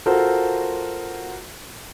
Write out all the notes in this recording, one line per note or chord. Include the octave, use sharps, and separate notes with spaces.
F4 F#4 A4 A#4 C5